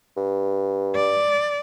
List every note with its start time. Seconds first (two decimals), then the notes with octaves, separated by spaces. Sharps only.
0.17 G2
0.96 D5